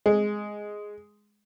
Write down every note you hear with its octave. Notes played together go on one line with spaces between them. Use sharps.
G#3